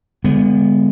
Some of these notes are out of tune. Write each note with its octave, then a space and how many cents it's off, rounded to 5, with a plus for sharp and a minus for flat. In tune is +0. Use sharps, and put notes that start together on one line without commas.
D3 -20 G#3 -35 B3 +0